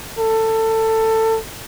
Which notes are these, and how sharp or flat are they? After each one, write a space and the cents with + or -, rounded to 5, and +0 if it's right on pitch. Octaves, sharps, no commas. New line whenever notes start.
A4 +20